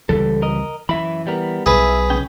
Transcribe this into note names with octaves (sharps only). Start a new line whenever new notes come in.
C#2 E3 G3 A4
A#4 D#5
F#2 E3 E5 B5
G3 B3 A#4
B1 E4 G#4 B4
C#2 C#4 G5